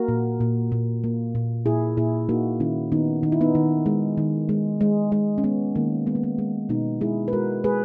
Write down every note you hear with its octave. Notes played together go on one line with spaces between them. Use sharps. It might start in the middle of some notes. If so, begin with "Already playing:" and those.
Already playing: A#3 F#4 A#4
A#2
A#2
A#2
A#3
A#2
A#2 E4 G#4
A#2 E4 G#4
A#3 D#4 F#4
D#3 C#4 E4
D#3 B3 D#4
D#3 D#4
E4
B3 D#4
D#3
G#3
D#3
G#3
G#3
G#3
C#4
G#3 B3
D#3 A#3
G#3 B3
A#3
B3
G#3
B2 B3 D#4
G#3 E4 G#4
B4
G#3 F#4 A#4
G#3 G#4 B4